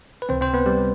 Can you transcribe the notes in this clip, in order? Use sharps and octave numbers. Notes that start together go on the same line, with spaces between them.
B4
C#2 C3 E3 C4 C5
C4 C5
B3 B4
G3 G4